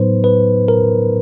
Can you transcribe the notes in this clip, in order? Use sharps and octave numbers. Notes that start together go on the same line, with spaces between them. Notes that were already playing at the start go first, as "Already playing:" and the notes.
Already playing: A2 F#3 B3 D#4 B4 C5
B4
A#4